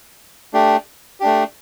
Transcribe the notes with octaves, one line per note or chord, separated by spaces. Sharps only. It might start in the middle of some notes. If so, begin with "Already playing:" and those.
A3 D4 G4
A3 D4 G4